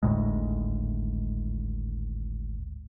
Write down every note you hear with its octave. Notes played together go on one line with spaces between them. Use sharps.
G#1 D2 A2 G#3